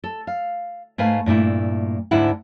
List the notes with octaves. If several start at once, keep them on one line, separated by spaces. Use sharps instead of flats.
A4
F5
G#2 A3 B4 F5 G#5
G2 A#2 A3 E4
D2 G#2 D3 E4 F#5